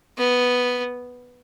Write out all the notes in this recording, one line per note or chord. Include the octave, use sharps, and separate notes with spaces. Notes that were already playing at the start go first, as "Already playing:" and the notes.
B3